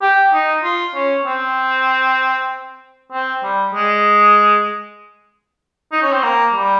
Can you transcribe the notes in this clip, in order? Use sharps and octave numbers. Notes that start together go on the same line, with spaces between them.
G4
D#4
F4
C#4
C4
C4
G3
G#3
D#4
C#4
C4
A#3
G3